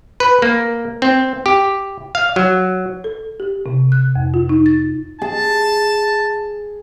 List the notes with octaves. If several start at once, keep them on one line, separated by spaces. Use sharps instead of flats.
B4
A#3
C4
G4
F5
F#3
A4
G4
C3
F#6
F2
F4
D#4
A6
G#4 A5